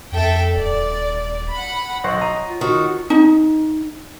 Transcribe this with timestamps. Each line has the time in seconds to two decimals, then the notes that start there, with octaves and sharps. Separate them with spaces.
0.12 F2 A4 E5 G5
0.56 D#1 D5
1.52 F#5 B5
2.04 B1 C5 C#5 D#5 F#5
2.21 A#5 D#7
2.48 F4
2.61 D#3 F#4
3.10 D#4